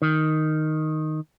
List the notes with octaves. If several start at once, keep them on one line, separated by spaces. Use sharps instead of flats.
D#3